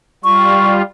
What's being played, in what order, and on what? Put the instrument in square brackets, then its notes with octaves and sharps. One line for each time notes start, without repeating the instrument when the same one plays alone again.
[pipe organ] G3 F4 [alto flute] C#6